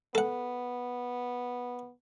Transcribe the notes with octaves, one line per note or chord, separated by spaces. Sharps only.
B3 A4 F#5